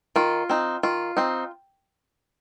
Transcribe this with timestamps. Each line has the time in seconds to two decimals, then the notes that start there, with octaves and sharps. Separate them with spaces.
0.16 D#3 F4
0.49 C4 D#4
0.83 D#3 F4
1.17 C4 D#4